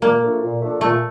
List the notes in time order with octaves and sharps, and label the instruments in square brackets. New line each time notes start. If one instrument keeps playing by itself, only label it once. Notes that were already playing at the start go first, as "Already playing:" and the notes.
[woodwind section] A#2 [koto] A#3
[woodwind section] F3 A3 D4 A4
A#2
F3 A3 D4 A4
[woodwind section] A#2 [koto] A3